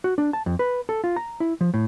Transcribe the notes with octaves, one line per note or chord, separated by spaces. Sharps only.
F#4
D4
A5
F2
B4
A4
F4
A#5
E4
F3
A2